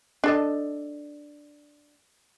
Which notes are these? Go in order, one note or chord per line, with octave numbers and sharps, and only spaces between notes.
D4 A4 D#5